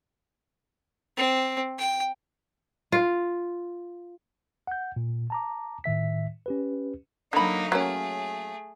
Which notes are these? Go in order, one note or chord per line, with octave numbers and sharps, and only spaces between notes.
C4
G5
F4
F#5 G6
A#2
A5 A#5 D6
A2 D#3 E5 B6
C#4 G4 B4
D3 F#3 A#3 D#4 B5
F#3 A3 A#3 C#4 G#4